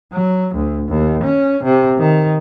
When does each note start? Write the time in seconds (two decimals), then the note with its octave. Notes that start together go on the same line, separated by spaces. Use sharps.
0.13 F#3
0.55 D2
0.89 D#2
1.24 C#4
1.64 C3
1.99 D#3